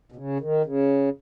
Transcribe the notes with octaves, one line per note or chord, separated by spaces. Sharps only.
B2
C#3
D#3
C#3